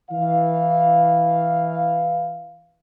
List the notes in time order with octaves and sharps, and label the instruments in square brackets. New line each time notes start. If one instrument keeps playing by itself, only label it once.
[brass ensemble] E3 F5